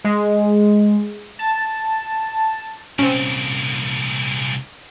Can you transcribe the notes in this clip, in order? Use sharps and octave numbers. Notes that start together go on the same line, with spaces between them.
G#3
A5
C2 A#2 C4 C#4